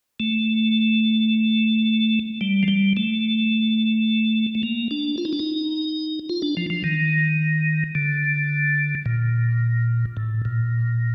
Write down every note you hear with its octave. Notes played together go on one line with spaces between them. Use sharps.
A3
G3
F3
G3
A3
A3
A#3
D4
F4
D#4
D4
D#4
F4
D4
F3
F3
D#3
D3
A#2
A2
A#2